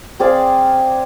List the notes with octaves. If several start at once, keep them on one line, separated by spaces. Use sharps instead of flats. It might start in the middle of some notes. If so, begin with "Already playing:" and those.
C4 G#4 D5 F5